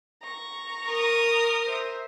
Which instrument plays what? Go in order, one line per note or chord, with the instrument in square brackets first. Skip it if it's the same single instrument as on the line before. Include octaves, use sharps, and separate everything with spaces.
[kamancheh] A#5 C#6
[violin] A#4 D#6
[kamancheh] C5 E5